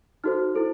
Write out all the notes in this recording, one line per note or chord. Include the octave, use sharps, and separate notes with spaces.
D#4 F#4 A4 C5 F6
E4 A4 C5